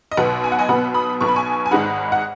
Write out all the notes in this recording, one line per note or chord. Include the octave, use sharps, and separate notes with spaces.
D#5
B1 B2 B3 F#5
G#5
F#5
D#5 G#5
B1 B2 B3 F#5 B5
B5 D#6
B1 B2 B3 C#6
B5
G#5 C#6
G#5
G#1 G#2 G#3 D#4 F#5 B5
F#5